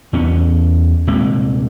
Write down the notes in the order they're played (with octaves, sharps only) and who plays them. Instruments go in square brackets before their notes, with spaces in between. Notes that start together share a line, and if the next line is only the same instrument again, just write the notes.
[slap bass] E2 B3 C#4
D#1 C3 G#3 A#3